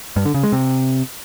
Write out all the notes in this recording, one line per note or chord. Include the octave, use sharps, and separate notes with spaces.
G2
D3
C#3
G#3
C3